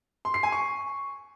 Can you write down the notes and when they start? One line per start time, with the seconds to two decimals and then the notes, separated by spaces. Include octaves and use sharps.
0.25 C6
0.34 C7
0.43 G#5
0.52 C#6